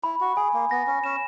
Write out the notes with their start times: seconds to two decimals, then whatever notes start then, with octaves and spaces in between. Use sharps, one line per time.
0.04 E4 B5
0.21 F#4
0.36 G#4 G#5
0.54 A#3
0.71 B3 A#6
0.87 C#4
1.04 C#4 E7